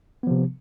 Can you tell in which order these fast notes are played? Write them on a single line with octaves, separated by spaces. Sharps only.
B3 F3 C3